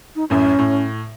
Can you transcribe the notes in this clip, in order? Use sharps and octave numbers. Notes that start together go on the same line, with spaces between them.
D#4
A1 F#2 A2 C#4
A2